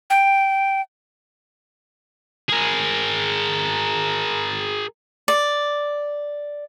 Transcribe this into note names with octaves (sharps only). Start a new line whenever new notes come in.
G5
G#4 A#4
D5